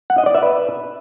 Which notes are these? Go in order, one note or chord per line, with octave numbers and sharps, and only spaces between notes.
F#5
D#5
D5
E5
B4